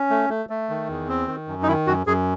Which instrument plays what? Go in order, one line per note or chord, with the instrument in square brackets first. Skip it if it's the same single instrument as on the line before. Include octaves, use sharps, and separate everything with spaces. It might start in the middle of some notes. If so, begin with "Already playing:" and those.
Already playing: [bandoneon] C#4
A3
A3
A3
D#3
E2
C4
D#3
F#2
D#4
D#3 E4
F#2 F#4
F#2 G#4